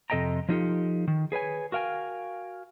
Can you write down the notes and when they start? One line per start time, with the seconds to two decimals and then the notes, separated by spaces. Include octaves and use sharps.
0.10 F2 C3 A4 D#5 G5 A#5
0.49 F3 F#3 D#4 F4 G4 A4
1.08 D#3
1.32 G#4 B4 C#5 G#5
1.72 F#4 A#4 F5 G5 G#5